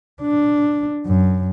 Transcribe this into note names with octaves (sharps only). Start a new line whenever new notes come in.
D4
F#2